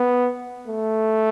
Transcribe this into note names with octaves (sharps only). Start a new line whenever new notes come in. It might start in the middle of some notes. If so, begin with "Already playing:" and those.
Already playing: B3
A3